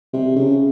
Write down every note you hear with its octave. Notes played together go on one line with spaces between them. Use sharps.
C3
C#3